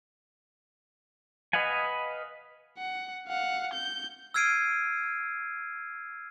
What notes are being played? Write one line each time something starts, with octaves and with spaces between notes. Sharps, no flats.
B4 D#5 F5 F#5 G#5
F#5
F5 F#5
G6
E6 F6 G#6 C7 D7 D#7